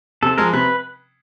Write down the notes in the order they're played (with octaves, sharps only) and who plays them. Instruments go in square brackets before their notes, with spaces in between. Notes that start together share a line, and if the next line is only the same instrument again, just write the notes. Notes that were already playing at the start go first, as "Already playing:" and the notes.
[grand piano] C3 [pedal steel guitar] A4
[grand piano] F3 G#3 [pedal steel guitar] A#4
[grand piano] C3 [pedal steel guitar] B4